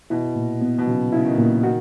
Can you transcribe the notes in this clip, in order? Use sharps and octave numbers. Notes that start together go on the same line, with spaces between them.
B2 E4
A#2
B3
B2
C#3 F#3
C#3 E4
D#3
A#2
D#3 F#4